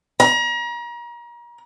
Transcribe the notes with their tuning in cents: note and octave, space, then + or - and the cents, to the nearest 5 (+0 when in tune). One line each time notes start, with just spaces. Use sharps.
A#5 +35